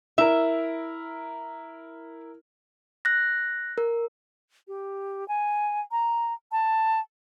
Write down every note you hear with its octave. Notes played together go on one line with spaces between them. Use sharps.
E4 A#4 E5
F#6 A#6
A#4
G4
G#5
A#5
A5